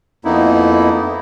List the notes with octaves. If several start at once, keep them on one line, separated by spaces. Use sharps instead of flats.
F2 A#3 B3 D#4 E4